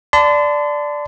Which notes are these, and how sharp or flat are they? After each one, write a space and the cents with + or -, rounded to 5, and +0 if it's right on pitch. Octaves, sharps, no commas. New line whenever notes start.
D5 +0 A5 +0 C6 -40